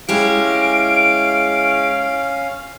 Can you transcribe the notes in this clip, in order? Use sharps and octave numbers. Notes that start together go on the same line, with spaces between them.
G#3 C#4 E4 G4 F5 D7